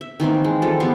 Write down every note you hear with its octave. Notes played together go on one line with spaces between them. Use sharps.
E5
D#3 E3 A#3 C4
G#3
F3 G3 A4
E3 B3 G4 F5